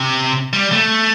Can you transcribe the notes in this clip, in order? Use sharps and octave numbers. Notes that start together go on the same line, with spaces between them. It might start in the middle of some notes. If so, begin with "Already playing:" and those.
Already playing: C3
G3
A3